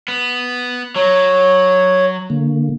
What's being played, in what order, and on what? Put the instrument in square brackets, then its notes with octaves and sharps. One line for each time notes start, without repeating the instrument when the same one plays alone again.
[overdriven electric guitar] B3
[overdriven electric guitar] F#3 [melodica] C#5
[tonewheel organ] D3 A#3